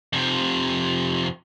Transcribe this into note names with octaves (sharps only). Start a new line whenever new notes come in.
F2 C3